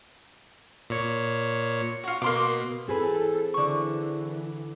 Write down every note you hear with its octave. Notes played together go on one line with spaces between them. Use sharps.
A#2 C#5 C#7
F4 F#4
B2 A#3 C6 D6
E3 C4 G#4 A4 B4
D3 E3 C#6